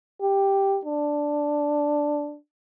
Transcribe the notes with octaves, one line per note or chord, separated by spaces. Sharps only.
G4
D4